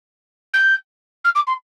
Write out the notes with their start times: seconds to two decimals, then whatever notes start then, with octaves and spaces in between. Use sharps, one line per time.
0.54 G6
1.24 F6
1.35 D6
1.47 C6